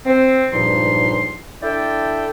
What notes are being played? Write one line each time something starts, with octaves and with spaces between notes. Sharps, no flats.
C4
C#2 G2 A#2 F3 D#4 C6
D4 E4 A4 D5 E5 G5